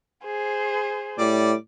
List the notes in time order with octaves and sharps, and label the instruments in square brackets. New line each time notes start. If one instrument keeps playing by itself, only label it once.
[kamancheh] G#4 C5
[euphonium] A2 [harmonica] G3 D5